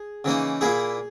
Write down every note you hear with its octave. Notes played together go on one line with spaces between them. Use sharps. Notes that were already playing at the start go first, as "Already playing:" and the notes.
Already playing: G#4
C#3 E3 A#3 D#4
A#2 A#3 E4 G#4